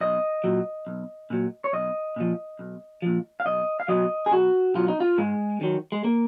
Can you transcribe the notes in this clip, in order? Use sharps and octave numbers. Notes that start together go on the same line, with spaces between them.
B1 D#5
A#2 F#3
B1
A#2 F#3
C#5
B1 D#5
A#2 F3
B1
A#2 F3
F5
B1 D#5
F5
B2 F#3 D#5
G#4
B1 F#4
B2 F#3 F4
D#4
F4
G#2 G#3
D#3 F#3
G#3
A#3